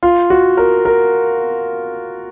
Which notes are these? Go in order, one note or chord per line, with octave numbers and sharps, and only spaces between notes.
F4
F#4
A#4
A#4